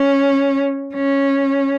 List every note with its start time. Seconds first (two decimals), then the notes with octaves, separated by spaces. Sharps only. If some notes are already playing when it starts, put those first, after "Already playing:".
Already playing: C#4
0.95 C#4